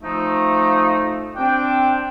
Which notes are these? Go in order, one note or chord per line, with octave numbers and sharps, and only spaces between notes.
F3 A3 D#4
C4 D4 G5